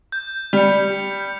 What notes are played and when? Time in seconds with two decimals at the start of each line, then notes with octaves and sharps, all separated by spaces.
0.12 G6
0.53 G3 C#7 F7